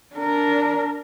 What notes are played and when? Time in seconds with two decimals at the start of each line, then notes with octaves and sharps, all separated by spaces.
0.15 D4 A#4